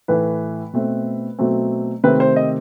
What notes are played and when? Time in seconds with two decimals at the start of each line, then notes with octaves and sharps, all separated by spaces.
0.08 A2 E3 A3 B4
0.73 B2 A3 C4
1.39 B2 F#3 A3 C4
2.04 C3 D#3 A3 C4 B4
2.20 C5
2.36 D#5